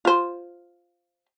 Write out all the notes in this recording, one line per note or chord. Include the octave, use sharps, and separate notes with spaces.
F4 C5